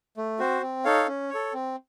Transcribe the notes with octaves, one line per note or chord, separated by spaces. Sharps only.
A3
C4 F#4 C5
C4
D#4 A4 C#5 F5
C#4
C#5
A4
C4